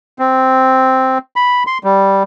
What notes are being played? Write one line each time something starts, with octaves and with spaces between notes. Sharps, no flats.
C4
B5
C6
G3